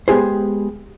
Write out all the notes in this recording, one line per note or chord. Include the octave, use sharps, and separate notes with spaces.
G#3 B3 G4 G#4 C5